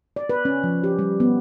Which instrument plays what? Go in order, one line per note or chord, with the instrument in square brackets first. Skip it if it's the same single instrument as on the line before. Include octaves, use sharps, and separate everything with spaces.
[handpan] D5
B4
C#4
F3
G4
G3
B3